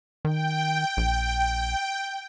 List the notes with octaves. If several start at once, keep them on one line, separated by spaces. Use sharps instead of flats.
D#3 G5
A#1